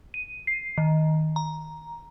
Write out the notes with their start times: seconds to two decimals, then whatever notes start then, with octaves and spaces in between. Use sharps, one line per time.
0.14 D#7
0.47 C7
0.78 D#3
1.36 A#5